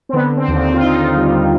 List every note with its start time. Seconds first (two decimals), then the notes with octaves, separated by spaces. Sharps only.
0.09 C4
0.13 D3 B3
0.37 C4
0.48 D#2
0.59 C4
0.74 F4
0.83 D#2 D#4
1.16 G3